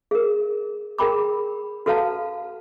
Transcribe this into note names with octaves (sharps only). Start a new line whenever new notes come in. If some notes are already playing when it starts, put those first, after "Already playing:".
G#4 A#4
G#4 A#4 G5 B5 D6
F#4 A4 B4 F5 F#5 A5